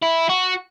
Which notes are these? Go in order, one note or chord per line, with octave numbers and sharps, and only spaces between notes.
E4
F#4